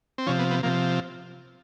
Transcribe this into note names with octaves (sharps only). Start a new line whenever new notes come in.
C4
C3 F3 C#4
B3
B3
C3 F3 A#3